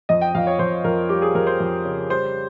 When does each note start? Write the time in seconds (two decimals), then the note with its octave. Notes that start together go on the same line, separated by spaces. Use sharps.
0.09 F2 D#5
0.21 G5
0.35 F2 F5
0.47 C#5
0.59 F2 C5
0.84 F2 A#4
1.09 G3 G4
1.22 G#4
1.35 F2 A#4
1.47 C5
1.60 F2
1.85 C#3
2.10 G3 C5